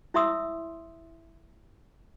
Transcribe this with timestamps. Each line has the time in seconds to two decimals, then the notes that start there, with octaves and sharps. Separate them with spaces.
0.14 E4 C#5 E5 C6 D#6 E6